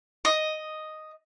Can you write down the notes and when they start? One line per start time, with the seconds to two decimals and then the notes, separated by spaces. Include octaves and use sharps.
0.25 D#5